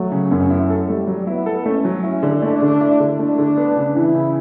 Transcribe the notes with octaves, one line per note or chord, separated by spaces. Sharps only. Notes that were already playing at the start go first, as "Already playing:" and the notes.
Already playing: F#3 A3
C#3
F#2
E4
A4
G3 A3
F#3
B3 E4
A4
A3 C#4
F#3
E4
D3
A3 D4
D3
E4
D3
A3 D4
D3
B3
C#3
E3 E4
C#3